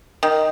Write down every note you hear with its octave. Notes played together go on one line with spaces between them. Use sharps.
D#3